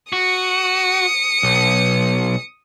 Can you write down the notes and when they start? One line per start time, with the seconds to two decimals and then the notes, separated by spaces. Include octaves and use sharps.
0.13 F#4 D#6 C#7
1.43 B1